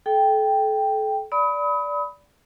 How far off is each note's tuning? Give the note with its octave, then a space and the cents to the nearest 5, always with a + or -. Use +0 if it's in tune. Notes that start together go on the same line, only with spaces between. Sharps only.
A4 -30 G5 +0
D5 -15 B5 +10 D#6 +40